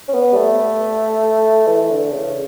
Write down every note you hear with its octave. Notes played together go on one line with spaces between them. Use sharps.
C#4
B3
G3
A3
E3
D3
C#3